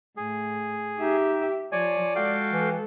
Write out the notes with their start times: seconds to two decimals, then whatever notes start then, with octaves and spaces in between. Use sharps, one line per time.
0.17 A2 G#4
0.98 D#4 G4 E5
1.72 F3 C#5 D5 G#5
2.16 G#3 F#4 A4 F5 G5
2.52 E3